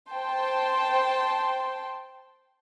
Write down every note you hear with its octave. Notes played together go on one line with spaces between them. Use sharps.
C5 G5 A5 C6